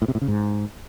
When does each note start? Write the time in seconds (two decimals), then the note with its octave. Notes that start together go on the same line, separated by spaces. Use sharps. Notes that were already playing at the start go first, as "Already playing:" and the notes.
0.02 A2
0.08 C3
0.15 A2
0.22 C#3
0.28 G#2